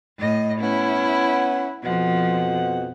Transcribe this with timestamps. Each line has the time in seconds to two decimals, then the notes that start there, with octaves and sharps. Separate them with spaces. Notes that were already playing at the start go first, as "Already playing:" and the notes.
0.19 A2 D#5
0.60 B3 C#4 E4 F#5
1.83 F2 B2 F3 F#5